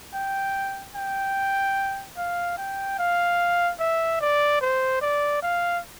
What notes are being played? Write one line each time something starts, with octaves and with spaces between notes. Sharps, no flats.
G5
G5
F5
G5
F5
E5
D5
C5
D5
F5